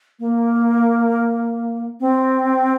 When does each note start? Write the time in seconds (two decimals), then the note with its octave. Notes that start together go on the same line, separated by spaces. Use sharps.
0.20 A#3
2.00 C4